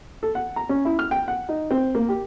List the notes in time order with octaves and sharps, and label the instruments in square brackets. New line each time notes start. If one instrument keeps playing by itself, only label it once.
[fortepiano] A4
F#5
A#5
C#4
E4
F6
G5
F#5
D#4
C4
A#3
G4